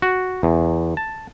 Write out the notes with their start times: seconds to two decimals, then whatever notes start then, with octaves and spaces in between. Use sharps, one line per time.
0.02 F#4
0.43 E2
0.97 A5